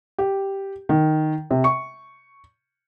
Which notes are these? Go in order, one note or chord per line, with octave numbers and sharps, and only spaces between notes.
G4
D#3
C3
C#6